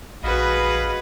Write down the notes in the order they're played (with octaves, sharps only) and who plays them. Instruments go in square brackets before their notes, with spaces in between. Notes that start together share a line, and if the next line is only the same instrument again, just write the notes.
[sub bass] A#1 [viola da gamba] F#4 G#4 B4 [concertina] D#5 F5 B5